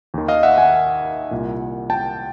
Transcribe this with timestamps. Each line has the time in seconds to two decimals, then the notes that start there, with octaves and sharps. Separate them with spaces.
0.14 D#2 D#3
0.28 D#5 F5
0.43 E5 F#5
0.58 F#5 G#5
1.31 C2 A#2
1.90 G5 A5